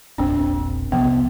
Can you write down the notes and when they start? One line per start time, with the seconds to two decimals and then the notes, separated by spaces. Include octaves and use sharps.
0.18 E1 A#1 C4 D4
0.92 C2 C3 F3 B3